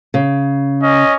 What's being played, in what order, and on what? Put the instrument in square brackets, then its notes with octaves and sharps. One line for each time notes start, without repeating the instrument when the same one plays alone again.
[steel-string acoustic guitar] C#3
[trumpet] C#4 [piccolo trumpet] D#5